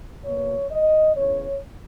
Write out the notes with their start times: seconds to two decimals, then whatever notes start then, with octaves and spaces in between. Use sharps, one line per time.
0.23 B2 A#3 C#5
0.71 D#5
1.17 E2 C#3 E3 C#5